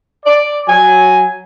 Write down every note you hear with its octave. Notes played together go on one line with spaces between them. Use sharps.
D5
F#3 G#5